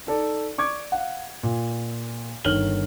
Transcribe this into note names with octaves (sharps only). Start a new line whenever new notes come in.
D#4 A4 D5
D5 C#6 D6 G#6
F5 F#5
A#2
G1 D#3 C#5 F6 F#7 G7